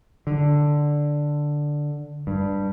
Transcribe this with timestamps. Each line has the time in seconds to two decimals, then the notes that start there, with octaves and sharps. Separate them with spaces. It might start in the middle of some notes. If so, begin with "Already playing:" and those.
0.27 D3
2.27 G2